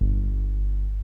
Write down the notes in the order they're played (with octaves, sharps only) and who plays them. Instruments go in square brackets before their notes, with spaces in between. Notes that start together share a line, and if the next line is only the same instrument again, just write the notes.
[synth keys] G1